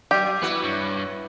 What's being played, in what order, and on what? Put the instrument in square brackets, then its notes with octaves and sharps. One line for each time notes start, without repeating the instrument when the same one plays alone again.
[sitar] F#3 [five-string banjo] G4 [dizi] D6
[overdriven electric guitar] B3 [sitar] E4 F#4 B4
[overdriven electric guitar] G2 [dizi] C#5